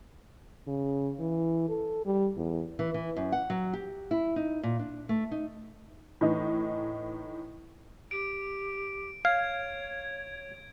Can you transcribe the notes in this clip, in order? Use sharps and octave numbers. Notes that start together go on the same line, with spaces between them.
C#3
E3
A4
G3
E2
E3
E3
F#2
F#5
F#3
G4
E4
D#4
A#2
D4
A3
D#4
A2 E3 D#4
G4 D7
C#5 F5 G#6